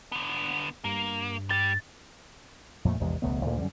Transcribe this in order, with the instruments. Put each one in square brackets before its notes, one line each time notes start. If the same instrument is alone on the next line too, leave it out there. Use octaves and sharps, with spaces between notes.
[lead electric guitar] D3 B3
[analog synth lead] G2 [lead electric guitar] A#3
[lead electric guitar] G3 [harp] A6
[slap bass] F2 A#2 A3
A#1 E2 C3 G#3
E1 C#2 A3 B3
D2 A#2 D3 D#3
F#2 D3 G3